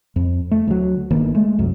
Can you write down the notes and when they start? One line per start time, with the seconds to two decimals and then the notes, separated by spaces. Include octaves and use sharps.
0.16 F2
0.51 A3
0.67 D2 F#3
1.11 G1 D#3 A#3
1.35 G#3 A3
1.58 C2 F#2